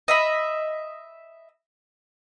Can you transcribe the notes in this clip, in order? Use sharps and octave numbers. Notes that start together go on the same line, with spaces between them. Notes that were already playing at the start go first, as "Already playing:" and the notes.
D#5 E5 B5